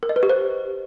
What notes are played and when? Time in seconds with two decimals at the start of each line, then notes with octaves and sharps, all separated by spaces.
0.03 A#4
0.09 D#5
0.16 B4
0.23 G4
0.29 C5